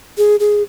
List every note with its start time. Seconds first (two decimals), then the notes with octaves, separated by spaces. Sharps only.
0.18 G#4
0.40 G#4